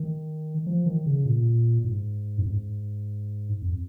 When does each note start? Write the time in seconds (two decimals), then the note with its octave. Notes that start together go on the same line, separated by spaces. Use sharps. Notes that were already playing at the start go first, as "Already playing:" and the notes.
Already playing: D#3
0.66 F3
0.86 D#3
1.06 C#3
1.25 A#2
1.84 G#2
2.39 F2
2.43 G#2
3.62 F2